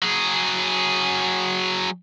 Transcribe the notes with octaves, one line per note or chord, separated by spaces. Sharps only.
F#3 G#4